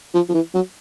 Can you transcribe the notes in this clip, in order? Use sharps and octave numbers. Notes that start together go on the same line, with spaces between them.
F3
F3
E3
F#3